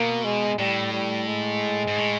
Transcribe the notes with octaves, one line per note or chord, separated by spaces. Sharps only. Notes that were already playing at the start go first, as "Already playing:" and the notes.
Already playing: B2 A#3
G#3
A2 G3
G3
G#3
G#2
A2